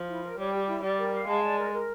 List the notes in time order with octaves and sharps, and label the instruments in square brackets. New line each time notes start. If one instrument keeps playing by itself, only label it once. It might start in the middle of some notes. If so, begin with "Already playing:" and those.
Already playing: [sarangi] F3
[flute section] E4
A#4
[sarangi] G3 [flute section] C#5
[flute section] G4
E4
[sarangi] G3 [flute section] D5
[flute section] A#4
F5
[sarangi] G#3 [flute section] A5
[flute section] D5
A#4
A#4